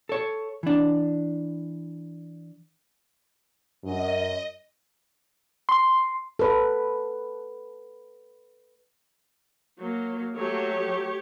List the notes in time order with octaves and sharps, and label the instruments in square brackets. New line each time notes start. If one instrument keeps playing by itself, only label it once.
[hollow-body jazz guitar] A4 C#5
E3 D4
[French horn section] F#2 [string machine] D#5
[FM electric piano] C6
[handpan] A4 B4
[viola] F#3 A#3
[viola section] F#3 A3 [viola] G4 C#5